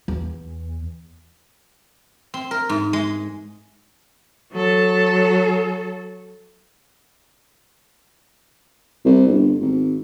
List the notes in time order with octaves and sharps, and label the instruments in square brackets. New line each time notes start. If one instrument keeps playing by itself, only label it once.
[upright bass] E2
[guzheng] C4
A#4
G#2
G#3
[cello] F#3 A4
[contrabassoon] C2
G1
G#1